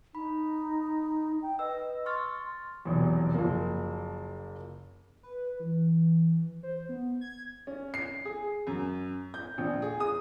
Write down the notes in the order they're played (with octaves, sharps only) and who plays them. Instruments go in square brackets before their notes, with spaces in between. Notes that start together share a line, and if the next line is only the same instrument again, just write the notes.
[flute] D#4 [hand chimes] B5
[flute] G5
[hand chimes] B4 E6 [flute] D#5
[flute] C6 [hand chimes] C#6 F6 A6
[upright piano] F1 B1 E2
F#1 F3 A#3
[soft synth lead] B4
E3
C5
B3
G#6
[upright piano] C#4
C7
G#4
F#2
G6
A#1
G#4
D#6